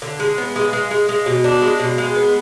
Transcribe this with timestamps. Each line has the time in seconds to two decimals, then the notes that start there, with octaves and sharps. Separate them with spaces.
0.02 D3
0.20 G#3
0.38 B3
0.56 G#3
0.73 G#3
0.91 G#3
1.09 G#3
1.26 B2
1.44 D4
1.62 G#3
1.80 B2
1.98 G#3
2.15 B3